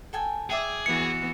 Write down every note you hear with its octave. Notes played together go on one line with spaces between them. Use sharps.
A4 G5 G#5
G#4 D5 E5 G5
E3 B3 F#4 C#7